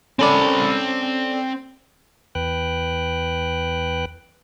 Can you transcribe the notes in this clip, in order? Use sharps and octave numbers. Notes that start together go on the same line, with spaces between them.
C4 C#4 A4 D5 B5
E2 B4 G5 F#6